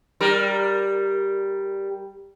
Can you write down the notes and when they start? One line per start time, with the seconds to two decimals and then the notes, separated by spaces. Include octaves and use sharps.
0.21 G3 A#4